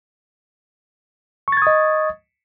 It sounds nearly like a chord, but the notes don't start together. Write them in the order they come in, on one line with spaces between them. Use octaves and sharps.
C#6 A6 G#6 D#6 D#5